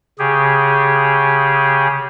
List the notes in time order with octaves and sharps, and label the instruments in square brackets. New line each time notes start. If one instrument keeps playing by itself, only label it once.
[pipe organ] C#3 G4 G#4